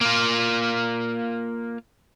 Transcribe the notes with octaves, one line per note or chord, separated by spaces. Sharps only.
A#3 F4